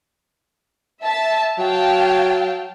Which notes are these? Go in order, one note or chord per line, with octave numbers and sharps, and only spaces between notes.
E5 A5
F#3 F5 G5 A5